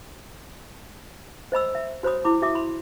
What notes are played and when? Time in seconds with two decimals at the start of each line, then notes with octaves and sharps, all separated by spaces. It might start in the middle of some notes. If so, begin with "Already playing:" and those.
1.52 C5 D#5 B5 E6
1.75 E5
2.03 F#4 C5 C#5 B5 D#6
2.25 E4 B5 D6
2.42 F#4 E5 D6 D#6
2.55 B5 C6